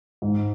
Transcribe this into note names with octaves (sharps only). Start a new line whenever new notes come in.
G#2